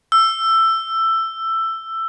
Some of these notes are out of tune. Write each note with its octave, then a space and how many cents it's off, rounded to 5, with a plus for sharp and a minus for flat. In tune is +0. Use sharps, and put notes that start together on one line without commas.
E6 +15